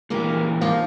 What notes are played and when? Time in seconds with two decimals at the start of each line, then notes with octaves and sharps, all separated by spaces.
0.10 A#2 E3 A#3 G4 G#4 A#4
0.62 F3 A#3 D#4